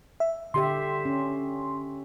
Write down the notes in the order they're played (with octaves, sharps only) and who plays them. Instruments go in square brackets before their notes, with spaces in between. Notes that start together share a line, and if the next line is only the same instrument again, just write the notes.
[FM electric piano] E5
[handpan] D3 G4 E5 [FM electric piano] C6
[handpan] C#4